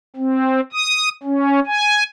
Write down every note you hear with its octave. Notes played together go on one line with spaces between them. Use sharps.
C4
D#6
C#4
G#5